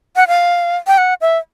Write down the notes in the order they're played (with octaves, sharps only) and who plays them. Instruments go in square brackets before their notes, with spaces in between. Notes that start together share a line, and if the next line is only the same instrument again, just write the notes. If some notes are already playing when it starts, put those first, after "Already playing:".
[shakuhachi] F#5
F5
G5
F#5
E5